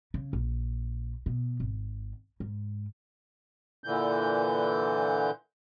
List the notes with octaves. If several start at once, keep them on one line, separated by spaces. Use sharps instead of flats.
C#3
A#1
B2
G#1
G#2
A#2 D3 E3 G6